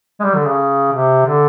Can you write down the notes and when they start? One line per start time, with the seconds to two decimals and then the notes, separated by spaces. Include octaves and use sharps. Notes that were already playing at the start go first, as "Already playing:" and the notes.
0.20 G#3
0.24 G3
0.35 D3
0.47 C#3
0.92 C3
1.26 D3